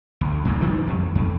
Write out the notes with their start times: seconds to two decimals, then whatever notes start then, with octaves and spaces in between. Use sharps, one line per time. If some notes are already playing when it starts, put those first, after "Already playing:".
0.21 D2
0.45 F#2 A#2 C#3
0.61 D#3 F3 G3
0.87 F2
1.15 F2